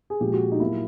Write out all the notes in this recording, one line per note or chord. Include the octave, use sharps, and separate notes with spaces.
G#4
A#2 F3 G#3 G4
F#4
D#4
A#2 F#3 A#3 E4